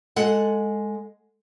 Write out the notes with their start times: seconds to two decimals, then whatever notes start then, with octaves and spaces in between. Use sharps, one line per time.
0.16 G#3 A4 F#5